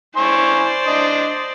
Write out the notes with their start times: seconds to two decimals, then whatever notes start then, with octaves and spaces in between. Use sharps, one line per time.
0.17 E4 C5 D5 G#5 C#6
0.87 D4 D#5